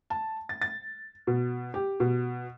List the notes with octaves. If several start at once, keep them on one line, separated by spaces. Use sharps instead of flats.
A5
A6
A6
B2
G4
B2